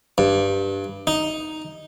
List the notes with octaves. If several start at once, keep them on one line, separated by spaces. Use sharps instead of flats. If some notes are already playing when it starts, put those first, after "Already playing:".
G2
D#4